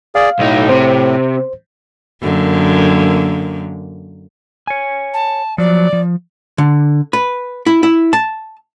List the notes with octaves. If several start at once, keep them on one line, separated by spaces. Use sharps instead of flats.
G#4 D5 F5
B1 A2 D#4
C3 C5
F#2 D3 A#3
C#5 G#5
A5
F3 F#3 D5
F3
D3
B4
E4
E4
A5